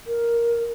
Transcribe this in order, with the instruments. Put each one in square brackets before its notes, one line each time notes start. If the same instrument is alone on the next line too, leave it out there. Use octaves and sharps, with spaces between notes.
[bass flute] A#4